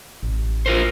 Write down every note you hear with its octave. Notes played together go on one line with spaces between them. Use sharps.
A1
F4 A#4 C5